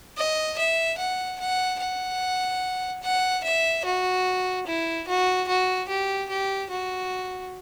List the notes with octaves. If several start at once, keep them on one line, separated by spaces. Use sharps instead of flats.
D#5
E5
F#5
F#5
F#5
F#5
E5
F#4
E4
F#4
F#4
G4
G4
F#4